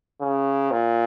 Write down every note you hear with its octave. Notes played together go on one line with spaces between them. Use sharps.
C#3
A#2